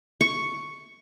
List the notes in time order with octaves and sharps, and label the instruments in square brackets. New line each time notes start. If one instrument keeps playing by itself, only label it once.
[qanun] C#6